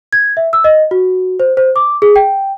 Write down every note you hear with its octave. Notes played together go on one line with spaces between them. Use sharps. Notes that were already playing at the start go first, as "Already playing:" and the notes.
G#6
E5
E6
D#5
F#4
C5
C5
D6
G#4
G5